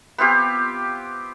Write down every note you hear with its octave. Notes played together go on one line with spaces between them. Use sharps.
B3 C4 F4 G4